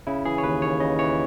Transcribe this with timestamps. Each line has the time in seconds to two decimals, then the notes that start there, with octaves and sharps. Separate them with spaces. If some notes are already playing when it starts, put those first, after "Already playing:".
0.07 C#3 E4
0.25 E3 G#4
0.38 C#5
0.44 D#2 B4
0.62 D#2 C#5
0.80 C#3 D#5
0.98 E3 C#5